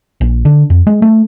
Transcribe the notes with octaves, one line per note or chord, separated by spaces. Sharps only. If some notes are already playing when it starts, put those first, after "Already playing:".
A#1
D3
F2
G#3
A3